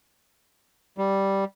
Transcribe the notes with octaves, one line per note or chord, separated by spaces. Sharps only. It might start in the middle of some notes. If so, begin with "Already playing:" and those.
G3